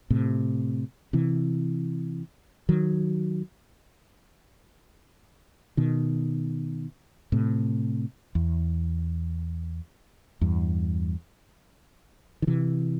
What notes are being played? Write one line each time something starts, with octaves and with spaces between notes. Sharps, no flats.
A2 C3
C3 E3
D#3 F#3
B2 D#3
A2 C3
E2
E2 G2
D#3
C3 E3